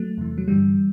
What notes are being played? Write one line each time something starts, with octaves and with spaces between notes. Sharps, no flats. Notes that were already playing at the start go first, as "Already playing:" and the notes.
Already playing: F#3 A3
E2 C3 E3
F#3
G2 D3 E3 G3